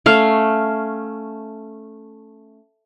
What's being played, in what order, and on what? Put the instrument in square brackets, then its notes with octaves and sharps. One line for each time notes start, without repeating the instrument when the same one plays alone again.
[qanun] A3 C#4 F5